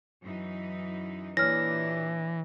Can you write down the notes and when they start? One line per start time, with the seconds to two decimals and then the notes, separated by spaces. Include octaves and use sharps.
0.22 F#2 E3 D#4
1.37 A#2 E3 D4 G4 C#5 F6 A#6